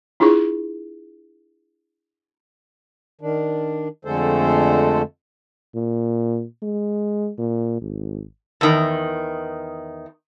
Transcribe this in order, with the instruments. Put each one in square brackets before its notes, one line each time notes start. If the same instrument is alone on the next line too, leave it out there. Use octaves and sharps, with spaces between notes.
[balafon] D4 E4 F4 G#4 C#6
[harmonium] D#3 D4
F2 D3 G#3 A3 A4 C5
[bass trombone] A#2
G#3
A#2
G#1
[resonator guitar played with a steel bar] E2 D#3